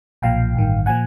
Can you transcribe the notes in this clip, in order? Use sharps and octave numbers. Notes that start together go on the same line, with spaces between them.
B1 A#2 F3 F5 G5
A1 G2 D#3
A#2 F3 F#5 G#5